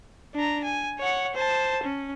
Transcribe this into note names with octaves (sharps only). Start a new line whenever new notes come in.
D4 A#5
G#5
C#5 F#5
C5 A5
C#4